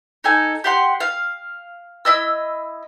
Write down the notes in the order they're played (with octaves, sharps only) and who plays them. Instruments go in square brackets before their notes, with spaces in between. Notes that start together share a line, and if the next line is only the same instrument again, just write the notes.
[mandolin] D#4 A4 G#5
G4 F#5 C6
F5
E4 D#5 E6